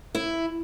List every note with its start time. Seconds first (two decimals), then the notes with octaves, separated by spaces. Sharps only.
0.15 E4